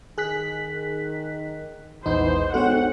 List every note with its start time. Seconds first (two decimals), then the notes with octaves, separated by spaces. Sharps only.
0.18 D#3 G#4 F#6 B6
2.05 A#1 E2 E3 G#3 B3 D#4 C5
2.54 G#2 B3 C4 F#4 A4 C#5 F#5